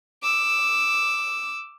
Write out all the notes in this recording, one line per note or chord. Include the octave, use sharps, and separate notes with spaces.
D6 E6